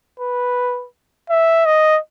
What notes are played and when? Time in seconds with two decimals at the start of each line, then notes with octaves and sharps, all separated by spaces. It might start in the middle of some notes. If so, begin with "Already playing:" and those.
0.20 B4
1.30 E5
1.65 D#5